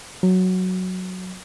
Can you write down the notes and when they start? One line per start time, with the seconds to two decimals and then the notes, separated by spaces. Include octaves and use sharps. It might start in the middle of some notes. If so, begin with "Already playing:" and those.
0.23 F#3